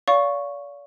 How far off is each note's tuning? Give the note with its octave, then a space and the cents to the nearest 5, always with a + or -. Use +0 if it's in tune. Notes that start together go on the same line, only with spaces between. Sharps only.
D5 -40 F5 +10 C#6 +0